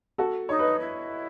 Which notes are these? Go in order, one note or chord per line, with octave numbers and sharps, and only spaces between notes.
F#4 A4
D#4 C#5
B4 D#5
E4